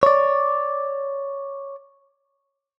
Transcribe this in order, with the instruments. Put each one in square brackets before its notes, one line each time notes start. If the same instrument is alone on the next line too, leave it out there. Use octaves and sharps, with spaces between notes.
[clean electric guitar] C#5 D5